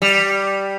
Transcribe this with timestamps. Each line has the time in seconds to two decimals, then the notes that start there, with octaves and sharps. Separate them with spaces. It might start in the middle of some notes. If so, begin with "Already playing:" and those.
0.02 G3